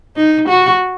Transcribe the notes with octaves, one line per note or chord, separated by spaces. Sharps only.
D#4
F#4